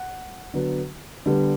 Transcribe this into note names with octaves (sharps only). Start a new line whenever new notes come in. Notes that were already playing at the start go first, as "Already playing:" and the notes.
Already playing: F#5
D3 F#3 B3
D3 G3 B3